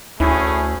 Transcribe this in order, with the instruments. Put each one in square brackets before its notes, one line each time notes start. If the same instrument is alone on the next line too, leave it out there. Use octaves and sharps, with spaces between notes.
[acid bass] D2 [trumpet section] A3 C#4 G#4 [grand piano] E4